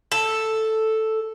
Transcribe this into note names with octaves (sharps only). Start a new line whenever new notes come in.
A4